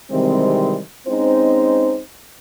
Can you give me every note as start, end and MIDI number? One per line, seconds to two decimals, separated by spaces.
0.11 0.79 48
0.11 0.79 51
0.11 0.79 52
0.11 0.79 55
0.11 0.79 56
0.11 0.79 60
1.08 2.00 56
1.08 2.00 60
1.08 2.00 61
1.08 2.00 63
1.08 2.00 72